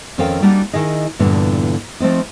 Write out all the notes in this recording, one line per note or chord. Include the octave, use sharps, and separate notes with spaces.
F2 D#3 C#4 A4 F5 G5
G3 A#3 D4 D#4 F#4
D#3 E4 G#4 D#5
E2 G2 A#2 D3
F3 A3 C4 D#4